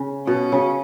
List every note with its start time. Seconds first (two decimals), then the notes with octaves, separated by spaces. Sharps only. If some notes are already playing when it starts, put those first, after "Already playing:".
Already playing: C#3
0.27 B2 C#4
0.52 C#3